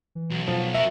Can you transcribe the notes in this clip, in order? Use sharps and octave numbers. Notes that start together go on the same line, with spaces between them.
E3
B1
B2 F3
F#4 A#4 E5